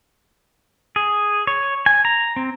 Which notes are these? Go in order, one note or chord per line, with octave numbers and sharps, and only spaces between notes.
G#4
C#5
G#5
A#5
C4